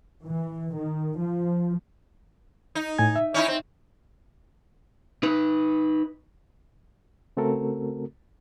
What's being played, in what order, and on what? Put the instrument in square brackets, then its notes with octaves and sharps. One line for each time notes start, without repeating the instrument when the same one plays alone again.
[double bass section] E3
D#3
F3
[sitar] D#4
[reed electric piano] A2 G#5 G#6
E5
[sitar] C#4 D#4 E4
C4
[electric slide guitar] D#4 B4
[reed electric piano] C#3 A3 C4 F#4 A4 A#4